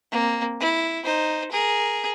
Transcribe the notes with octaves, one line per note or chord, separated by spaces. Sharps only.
A#3 C4
E4
D#4 C5
G#4 A#4